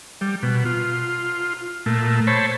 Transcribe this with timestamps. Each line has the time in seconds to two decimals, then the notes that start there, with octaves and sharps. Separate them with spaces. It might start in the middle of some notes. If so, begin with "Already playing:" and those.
0.21 G3
0.43 B2
0.65 F4
1.86 A#2 A3
2.27 C5 C#5 A5 B5